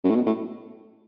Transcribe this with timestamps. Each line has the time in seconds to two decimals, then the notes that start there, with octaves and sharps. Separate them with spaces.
0.04 F#2
0.10 A2
0.15 B2
0.26 A2